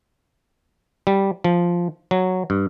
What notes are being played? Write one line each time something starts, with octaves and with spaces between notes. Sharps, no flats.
G3
F3
F#3
G2